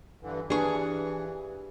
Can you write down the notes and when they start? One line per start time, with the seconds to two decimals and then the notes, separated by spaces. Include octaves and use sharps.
0.21 G2 D3 E3
0.50 E3 D4 G4 G#4 B4 F5 C#6